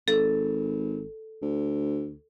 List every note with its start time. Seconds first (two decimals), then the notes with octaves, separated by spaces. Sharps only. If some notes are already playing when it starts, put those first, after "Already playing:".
0.08 G#1 A4
1.42 D2